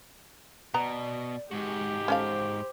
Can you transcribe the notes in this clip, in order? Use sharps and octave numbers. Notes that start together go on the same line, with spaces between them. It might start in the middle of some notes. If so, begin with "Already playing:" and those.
B2 B3 D5 A#5
G#2 G#3 F#4 G4
C#4 A4 C5 F5